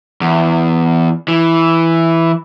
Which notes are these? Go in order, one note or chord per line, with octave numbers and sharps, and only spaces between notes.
E2
E3